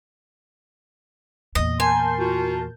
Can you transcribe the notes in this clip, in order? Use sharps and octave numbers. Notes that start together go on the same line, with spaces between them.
E2 A#2 D#5
A#4 G#5 A5 C6 G6
F4 F#4